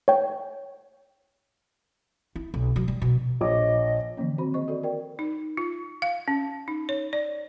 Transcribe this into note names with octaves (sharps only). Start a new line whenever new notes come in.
C#5 G5
E4
B1
F#3
G3
B2
A#1 C#5 D#5 D6
D3 E3 F3 A#3 C#4
D#3 C4 F#4 C5 B5
G#4 C5 D#5 C#6
F#4 A4 D5
F#4 A#4 D5 G5
D#4
F4
F5
C#4
D#4
C#5
D5